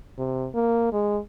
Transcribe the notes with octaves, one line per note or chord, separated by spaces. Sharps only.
C3
A#3
G#3